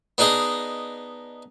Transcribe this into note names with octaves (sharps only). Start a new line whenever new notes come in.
B3 D4 D#4 G#4 D#5